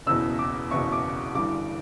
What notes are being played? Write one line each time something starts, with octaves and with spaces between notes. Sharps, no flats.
F#1 E2 B2 E6
D6
F#1 E2 B2 C#6
D6
G1 G2 E3 D6